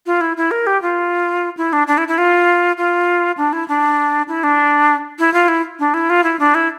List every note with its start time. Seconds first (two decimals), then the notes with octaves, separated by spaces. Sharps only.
0.06 F4
0.21 E4
0.37 E4
0.51 A#4
0.67 G4
0.82 F4
1.57 E4
1.73 D4
1.87 D4
1.98 E4
2.08 E4
2.18 F4
2.77 F4
3.37 D4
3.53 E4
3.68 D4
4.28 E4
4.44 D4
5.19 E4
5.34 F4
5.48 E4
5.79 D4
5.94 E4
6.10 F4
6.24 E4
6.39 D4
6.55 E4